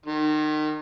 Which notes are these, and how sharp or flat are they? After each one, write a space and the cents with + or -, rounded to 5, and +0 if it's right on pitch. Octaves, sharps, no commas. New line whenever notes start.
D#3 -30